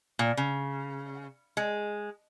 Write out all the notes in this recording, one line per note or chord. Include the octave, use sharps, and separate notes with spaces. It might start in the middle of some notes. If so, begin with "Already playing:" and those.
A#2
C#3
G#3